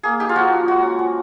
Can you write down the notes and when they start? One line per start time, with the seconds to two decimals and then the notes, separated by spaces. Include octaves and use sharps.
0.03 A#3 G#4
0.20 D#4 G4
0.29 F4
0.36 F3 F#4
0.52 F3
0.67 G#3 F#4
0.83 C#4
0.99 F3